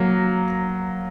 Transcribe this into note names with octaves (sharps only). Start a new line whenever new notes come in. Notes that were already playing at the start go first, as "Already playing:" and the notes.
Already playing: F#3 A#3